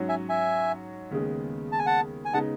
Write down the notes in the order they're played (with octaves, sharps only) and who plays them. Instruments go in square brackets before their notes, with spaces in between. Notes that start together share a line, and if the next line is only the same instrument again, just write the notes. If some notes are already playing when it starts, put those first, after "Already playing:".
Already playing: [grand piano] G#2 F#3 C#4 F#4
[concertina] E5 G#5
E5 G#5
[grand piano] D#2 C#3 G#3 B3
[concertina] A5
G#5
F#5 A5
G#5
[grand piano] C#3 G#3 B3 D#4 [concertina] F#5 A5